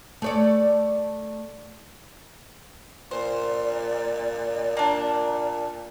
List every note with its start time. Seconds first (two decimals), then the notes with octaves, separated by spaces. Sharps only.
0.22 A3 C#5 D5
3.11 A#2 C5 D5
4.77 A#3 D4